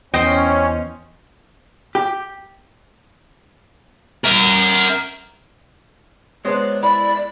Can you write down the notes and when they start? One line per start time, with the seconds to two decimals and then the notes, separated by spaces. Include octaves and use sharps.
0.14 E2 C#4 C5 D#5 G5
1.95 G4
4.24 A#4 E5
6.45 F#3 G#3 B3 D4 C5
6.83 E4 D5 B5